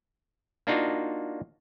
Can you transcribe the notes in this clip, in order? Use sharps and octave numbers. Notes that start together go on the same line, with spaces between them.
A#3 D4 D#4 F4 F#4